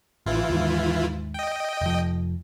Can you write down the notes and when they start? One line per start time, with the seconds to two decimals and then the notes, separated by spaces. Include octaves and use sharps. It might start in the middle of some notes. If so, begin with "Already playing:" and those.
0.26 A1 E3 E4 F4
0.50 D#2 G#2
1.34 D#5 G5
1.81 F1 F3